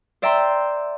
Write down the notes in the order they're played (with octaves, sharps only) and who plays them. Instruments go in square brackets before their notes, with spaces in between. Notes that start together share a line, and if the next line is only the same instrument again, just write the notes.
[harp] C5 D5 E5 G5 A#5 C6